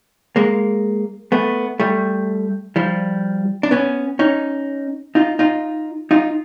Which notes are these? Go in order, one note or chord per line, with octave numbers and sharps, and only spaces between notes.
G#3 A#3
A3 B3
G3 A3
F3 G3
D4
B3 C#4
C#4 D#4
D#4 F4
D#4 F4
D#4 F4